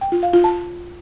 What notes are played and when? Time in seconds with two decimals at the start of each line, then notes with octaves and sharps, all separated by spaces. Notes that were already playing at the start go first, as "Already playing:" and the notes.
0.01 G5
0.12 F4
0.23 F5
0.33 F4
0.44 A5